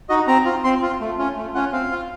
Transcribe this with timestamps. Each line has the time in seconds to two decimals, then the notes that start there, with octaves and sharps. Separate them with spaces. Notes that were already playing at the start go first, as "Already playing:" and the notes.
0.09 D#4 F#4 D#5
0.27 C4 A#5
0.45 F4
0.64 C4 C6
0.82 F4
1.00 A3
1.18 C#4 F4
1.36 A3
1.55 C#4 F4 F#5
1.72 C4 F5
1.91 F4